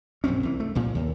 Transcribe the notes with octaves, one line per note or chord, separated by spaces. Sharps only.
A#1 F#2 C4 C#4
C2 E3
A3
C2 A#2 F3
D#2